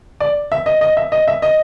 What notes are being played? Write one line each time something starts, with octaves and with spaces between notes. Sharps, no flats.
D5
E5
D#5
D#5
E5
D#5
E5
D#5